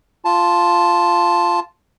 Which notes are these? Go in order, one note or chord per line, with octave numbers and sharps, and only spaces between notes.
F4 A5